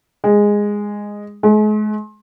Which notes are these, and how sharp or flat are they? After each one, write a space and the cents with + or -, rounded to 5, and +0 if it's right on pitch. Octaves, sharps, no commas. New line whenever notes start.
G#3 -10
G#3 +40